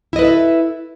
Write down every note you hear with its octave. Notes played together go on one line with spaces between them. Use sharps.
E4 A4 B4 D#5 E5